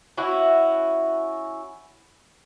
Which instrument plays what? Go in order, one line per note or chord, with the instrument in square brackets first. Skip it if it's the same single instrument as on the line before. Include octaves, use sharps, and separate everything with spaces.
[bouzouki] C#4 E4 F#4